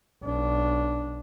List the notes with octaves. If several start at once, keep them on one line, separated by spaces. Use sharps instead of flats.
B1 D4